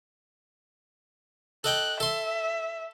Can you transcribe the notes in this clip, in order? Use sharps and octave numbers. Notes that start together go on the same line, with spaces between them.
A4 D#5 G5 F#6
A4 E5 C6